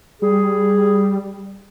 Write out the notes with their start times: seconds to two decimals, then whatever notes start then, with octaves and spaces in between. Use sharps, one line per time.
0.22 G3 G#4